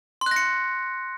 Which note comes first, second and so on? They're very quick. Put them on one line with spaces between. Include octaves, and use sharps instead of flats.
C6 F#6 A#6 C#7